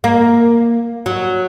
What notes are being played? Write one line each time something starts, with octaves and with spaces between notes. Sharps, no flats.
A#3
F#3